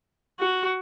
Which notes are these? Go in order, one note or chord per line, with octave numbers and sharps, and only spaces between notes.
F#4